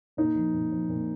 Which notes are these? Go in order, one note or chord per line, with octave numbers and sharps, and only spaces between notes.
A#2 D#4
F3
A#2
F3
A#2